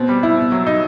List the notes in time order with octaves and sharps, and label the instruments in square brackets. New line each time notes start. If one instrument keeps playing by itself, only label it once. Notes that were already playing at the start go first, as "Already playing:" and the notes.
Already playing: [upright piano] B2 C4
G3
E4
B2
F#3
D#4